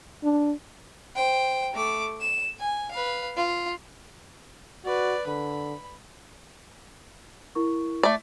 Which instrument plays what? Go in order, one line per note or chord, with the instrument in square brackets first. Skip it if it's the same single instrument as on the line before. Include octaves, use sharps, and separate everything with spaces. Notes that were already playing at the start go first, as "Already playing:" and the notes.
[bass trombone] D4
[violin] C5 G5
A3 D6
E7
G#5
B4 F5
F4
[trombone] F#4 [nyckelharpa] B4 D5
[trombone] D3 [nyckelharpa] B5
[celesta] E4 A#4 C#6
[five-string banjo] A3 D5